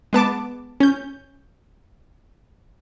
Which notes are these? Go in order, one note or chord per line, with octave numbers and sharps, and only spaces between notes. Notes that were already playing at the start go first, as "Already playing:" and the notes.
G#3 B3 A5 D6
C#4 G6